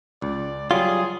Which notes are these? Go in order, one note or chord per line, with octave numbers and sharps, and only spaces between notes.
C#2 D5
F#3 G3 F4 G#4